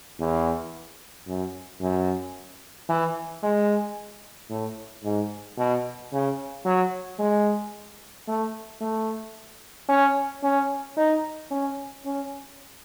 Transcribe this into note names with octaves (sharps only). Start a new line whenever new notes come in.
E2
F#2
F#2
E3
G#3
A2
G#2
B2
C#3
F#3
G#3
A3
A3
C#4
C#4
D#4
C#4
C#4